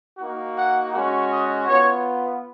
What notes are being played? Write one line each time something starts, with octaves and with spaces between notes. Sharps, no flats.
A#3 D#4 F#4
F#5
G#3 C#4 F#4
D#5
B3 F4 C#5